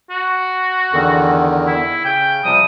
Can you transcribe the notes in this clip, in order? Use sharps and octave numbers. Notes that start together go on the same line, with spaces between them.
F#4
E2 D3 D#3
E4
C#3 G5
C3 F3 G3 D#6